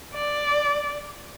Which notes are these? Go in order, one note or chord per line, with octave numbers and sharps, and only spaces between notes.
D5